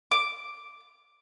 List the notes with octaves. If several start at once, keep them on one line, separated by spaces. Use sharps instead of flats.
D6